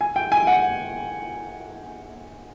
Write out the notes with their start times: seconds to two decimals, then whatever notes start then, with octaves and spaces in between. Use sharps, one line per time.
0.01 G#5
0.16 G5
0.32 G#5
0.47 F#5